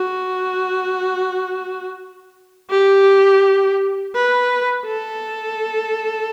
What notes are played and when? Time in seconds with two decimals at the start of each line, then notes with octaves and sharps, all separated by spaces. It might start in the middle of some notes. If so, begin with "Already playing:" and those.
Already playing: F#4
2.71 G4
4.15 B4
4.86 A4